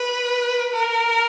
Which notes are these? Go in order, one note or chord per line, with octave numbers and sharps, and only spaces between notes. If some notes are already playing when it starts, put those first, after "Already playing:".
Already playing: B4
A#4